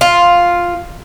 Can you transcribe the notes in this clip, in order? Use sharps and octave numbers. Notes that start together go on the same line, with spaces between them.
F4